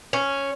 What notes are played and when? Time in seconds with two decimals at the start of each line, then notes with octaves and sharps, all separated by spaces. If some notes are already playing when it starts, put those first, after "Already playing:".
0.13 C#4